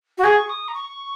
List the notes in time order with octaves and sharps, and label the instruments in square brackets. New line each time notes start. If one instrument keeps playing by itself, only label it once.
[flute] F#4
[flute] G#4 [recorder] C#6
[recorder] D#6
A#5
C#6